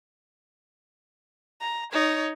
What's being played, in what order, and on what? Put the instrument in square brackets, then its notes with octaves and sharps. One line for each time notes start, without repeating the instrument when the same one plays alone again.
[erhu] A#5
[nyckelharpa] D#4 [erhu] C#5